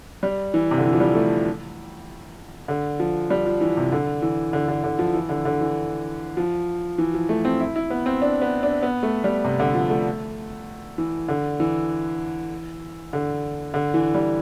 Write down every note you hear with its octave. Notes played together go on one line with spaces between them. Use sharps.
G3
E3
C3
D3
E3
F3
G3
A3
D3
F3
G3
F3
E3
C3
D3
E3
D3
D3
D3
F3
E3
D3
D3
E3
F3
E3
F3
A3
C4
E4
E4
B3
C4
D4
B3
D4
B3
A3
G3
C3
D3
F3
A3
E3
D3
E3
D3
D3
E3
G3